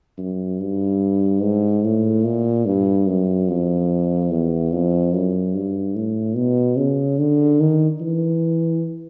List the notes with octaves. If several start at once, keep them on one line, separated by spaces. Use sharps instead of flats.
F#2
G2
G#2
A2
A#2
G2
F#2
F2
E2
F2
F#2
G2
A2
B2
C#3
D3
D#3
E3